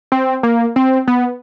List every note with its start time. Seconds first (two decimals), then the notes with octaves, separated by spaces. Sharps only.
0.12 C4
0.43 A#3
0.76 C4
1.08 B3